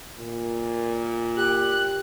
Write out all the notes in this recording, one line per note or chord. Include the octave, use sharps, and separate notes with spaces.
A#2
G4 F#6